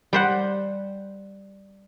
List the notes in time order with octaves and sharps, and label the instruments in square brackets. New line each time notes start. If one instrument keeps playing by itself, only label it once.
[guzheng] G3 C5 F#5